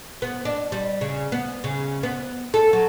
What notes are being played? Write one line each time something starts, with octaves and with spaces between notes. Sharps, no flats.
B3
D4
G3
C#3
B3
C#3
B3
A4
F#3